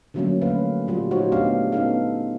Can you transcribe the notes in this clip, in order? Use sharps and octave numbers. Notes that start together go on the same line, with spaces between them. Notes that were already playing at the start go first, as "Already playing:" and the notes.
D3 F3 F#3 A3 A#3 C#4
D3 A3 A#3 C#4 B4 F5
A#2 G3 F4 F#4
D#4 F#4 C5 C#5
G#3 A3 B3 D4 G4 F5
B3 C#4 D#4 A4 F5